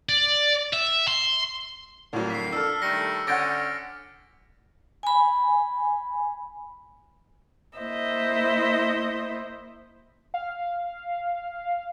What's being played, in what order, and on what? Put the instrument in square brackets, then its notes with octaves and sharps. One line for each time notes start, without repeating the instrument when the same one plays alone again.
[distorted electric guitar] D5
E5
C6
[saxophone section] F2 D3 A#3 [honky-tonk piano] A2 F#3
[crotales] B6 C7
[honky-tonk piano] D4 A4 [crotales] E6 F6
[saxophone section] D#3 G3 A3 [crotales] A#6 C#7
[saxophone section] D3 C#4 [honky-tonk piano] F#5 G6 A#6 [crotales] D6 A6 D7
[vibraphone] G#5 B5
[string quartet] A#3 E4 C5 D#5 E5
[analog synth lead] F5